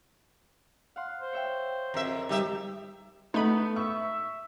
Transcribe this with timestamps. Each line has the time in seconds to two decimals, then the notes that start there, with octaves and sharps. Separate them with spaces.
0.96 F5 F#5 C6
1.21 C5
1.33 C#5 E5 G5
1.94 F2 G#4 A#4 E5
2.29 G#2 G3 D#4 G4 E5
3.34 A3 B3 D#4 B5
3.76 E5 C#6